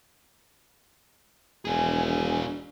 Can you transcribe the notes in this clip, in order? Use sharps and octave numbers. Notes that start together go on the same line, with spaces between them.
E1 D4 G#4 G#5